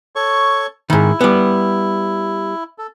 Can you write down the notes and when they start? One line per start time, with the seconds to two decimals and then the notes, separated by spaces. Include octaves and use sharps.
0.16 A4 C#5 C#6
0.90 G#2 D#3 E4
1.21 G3 B3
2.78 A4